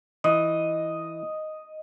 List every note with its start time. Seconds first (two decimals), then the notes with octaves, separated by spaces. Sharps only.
0.24 E3 D#5